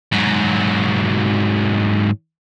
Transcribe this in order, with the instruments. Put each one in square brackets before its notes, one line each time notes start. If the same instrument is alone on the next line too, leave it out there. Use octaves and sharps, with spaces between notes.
[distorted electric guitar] G#2 F#3